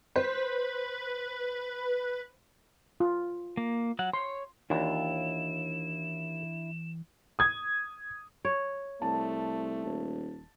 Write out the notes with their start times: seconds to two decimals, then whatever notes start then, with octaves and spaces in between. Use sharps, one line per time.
0.16 B4 C5
3.00 F4
3.57 A#3
3.99 F#3 F#5
4.13 C#5 C6
4.70 D#2 E3 D4 E4 F4 E7
7.39 D#6 G#6
8.45 C#5
9.02 C2 A3 A5
9.84 D#1